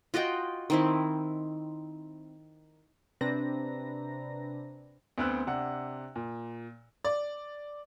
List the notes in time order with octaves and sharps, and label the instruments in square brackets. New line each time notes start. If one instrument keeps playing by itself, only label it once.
[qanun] F4 F#4 D#5 G5
D#3 C4 E4
[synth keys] C3 C4 D4 B4 A#5 A#6
[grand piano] D2 B3 C4 E6 F#6
C3 D4 F#5
A#2
D5